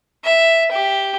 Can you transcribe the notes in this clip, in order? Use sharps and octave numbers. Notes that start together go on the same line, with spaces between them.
E5
G4